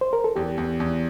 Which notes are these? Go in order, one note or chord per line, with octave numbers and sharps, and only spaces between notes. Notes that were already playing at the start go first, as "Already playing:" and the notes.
C5
A#4
A4
E2 G4
E2
E2